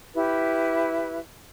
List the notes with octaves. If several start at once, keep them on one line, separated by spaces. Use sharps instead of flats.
E4 G4 B4